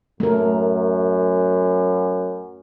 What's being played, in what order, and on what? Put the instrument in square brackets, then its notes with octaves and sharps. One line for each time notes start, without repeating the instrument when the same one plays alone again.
[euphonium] F#2 [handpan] A3 A#4